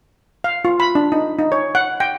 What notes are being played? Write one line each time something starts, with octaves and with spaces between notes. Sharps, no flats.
F5
F4
B5
D4
D#4
D#4
C#5
F#5
G5